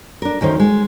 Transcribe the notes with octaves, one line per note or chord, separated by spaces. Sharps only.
D4 A#4
D2 D#3 C#4 C5
G#3